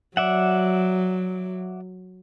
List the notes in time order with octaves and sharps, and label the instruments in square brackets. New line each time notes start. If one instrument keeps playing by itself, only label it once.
[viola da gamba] F#3 [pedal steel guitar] D5 E5 F#5